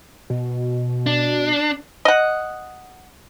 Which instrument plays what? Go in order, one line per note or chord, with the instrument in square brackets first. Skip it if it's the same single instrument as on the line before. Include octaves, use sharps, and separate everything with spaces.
[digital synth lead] B2
[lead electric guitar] D4
[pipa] D#5 F#5